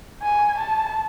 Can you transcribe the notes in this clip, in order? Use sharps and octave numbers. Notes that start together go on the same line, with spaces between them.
G#5
A5